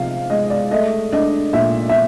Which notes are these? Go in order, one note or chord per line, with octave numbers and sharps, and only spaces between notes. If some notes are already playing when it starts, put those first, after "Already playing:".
Already playing: C3 F3 G#3 F5
G#3 D#5
D5
A3 D#5
D4 D#5
A#2 E5
E5